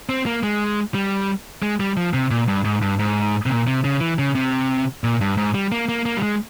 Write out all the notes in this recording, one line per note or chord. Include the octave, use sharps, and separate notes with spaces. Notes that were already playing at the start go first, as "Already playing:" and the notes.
C4
A#3
G#3
G3
G#3
G3
F3
C3
A#2
G2
G#2
G2
G#2
C3
A#2
C3
C#3
E3
C#3
C3
A#2
G2
G#2
G3
A#3
A#3
A#3
G3
G#3